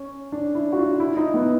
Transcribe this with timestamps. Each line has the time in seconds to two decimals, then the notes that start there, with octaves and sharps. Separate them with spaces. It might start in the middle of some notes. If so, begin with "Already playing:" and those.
Already playing: C#4
0.32 D4
0.55 E4
0.72 F#4
0.78 F4
1.00 E4
1.17 D#4
1.34 B3